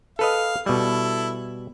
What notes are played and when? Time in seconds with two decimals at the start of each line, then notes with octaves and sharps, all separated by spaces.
0.19 A4 B4 D#5 F5
0.66 B2 G3 E4 A4